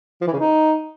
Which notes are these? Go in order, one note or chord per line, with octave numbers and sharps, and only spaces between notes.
F3
E3
C#3
D#4